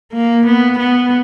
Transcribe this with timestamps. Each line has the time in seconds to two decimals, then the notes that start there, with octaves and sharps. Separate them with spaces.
0.13 A#3
0.46 B3
0.79 B3